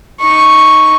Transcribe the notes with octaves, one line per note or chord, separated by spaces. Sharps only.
D#4 C#6